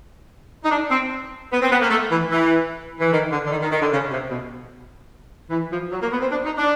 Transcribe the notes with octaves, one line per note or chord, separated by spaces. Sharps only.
D#4
D4
C4
B3
C4
B3
A#3
A3
E3
E3
E3
D#3
D3
D3
D#3
D#3
D#3
D3
C#3
C3
B2
E3
F3
F#3
A#3
B3
C4
D4
D#4
D4